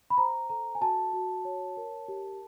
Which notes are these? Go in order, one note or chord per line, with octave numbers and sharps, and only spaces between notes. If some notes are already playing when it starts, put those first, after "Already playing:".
B5
C5 A#5
A4 A#5
G#5
F#4 A5
F#4
C#5
A#4
G4